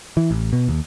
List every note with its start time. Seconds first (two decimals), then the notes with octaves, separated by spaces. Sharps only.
0.17 E3
0.31 A1
0.53 B2
0.69 D#2